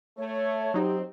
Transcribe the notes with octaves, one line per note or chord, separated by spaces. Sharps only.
A3 C#5
F#3 C4 D#4 G4